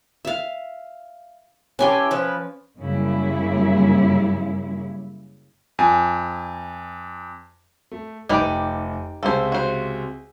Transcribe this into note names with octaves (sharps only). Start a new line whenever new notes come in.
E5 F5
E3 C#4 G4 A4 G#5 C6
F3 B4
F#2 C#3 G3 A#3 E4
F2 G#5
A3
F1 D#4 G4 B4 D7
C#2 C3 A4 C5
F#4 C5